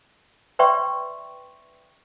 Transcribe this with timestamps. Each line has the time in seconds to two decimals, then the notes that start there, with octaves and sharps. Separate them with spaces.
0.59 B4 D5 E5 G5 C6 C#6